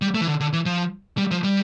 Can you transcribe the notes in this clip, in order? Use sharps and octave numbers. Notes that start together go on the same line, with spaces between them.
G3
A3
E3
D3
D3
E3
F3
G3
F3
G3